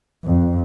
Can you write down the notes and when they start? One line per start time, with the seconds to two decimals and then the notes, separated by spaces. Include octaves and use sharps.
0.25 F2